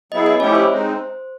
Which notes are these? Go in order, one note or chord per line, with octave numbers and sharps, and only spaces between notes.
F#3 B3 E4 G#4 D#5
D#5
F3 A3 C#4 E4 G4 C#5
C5
G#3 C4 D#4